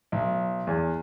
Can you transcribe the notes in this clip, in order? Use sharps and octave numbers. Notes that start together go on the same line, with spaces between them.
B1
E2